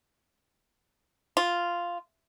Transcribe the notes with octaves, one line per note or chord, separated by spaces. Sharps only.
F4